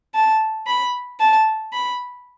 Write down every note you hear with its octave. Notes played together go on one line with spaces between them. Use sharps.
A5
B5
A5
B5